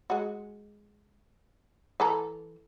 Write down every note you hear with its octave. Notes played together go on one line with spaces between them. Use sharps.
G#3 F#4
E3 A4 A#5